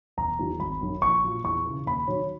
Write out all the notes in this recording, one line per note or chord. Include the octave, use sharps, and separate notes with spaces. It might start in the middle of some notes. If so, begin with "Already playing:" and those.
E1 A#5
E2 D#3 F#3
G#1 B5
F#2 D#3 F#3
A#1 C#6
A#2 F#3
E2 C#6
C#3 E3
D#2 B5
D#3 F#3 C#5